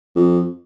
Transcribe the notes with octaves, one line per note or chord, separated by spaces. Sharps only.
F2